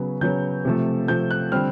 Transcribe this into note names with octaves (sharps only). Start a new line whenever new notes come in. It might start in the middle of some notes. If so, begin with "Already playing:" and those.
Already playing: C#3 F#3 B3
C#3 F#3 B3 G6
C3 F3 A3
C3 F3 A3 G6
F#6
D3 G3 C4 F6